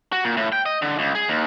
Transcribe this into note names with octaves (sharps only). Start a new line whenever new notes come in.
F#4
A#2
A2
G5
D#5
D3
C#2
G#4
D#2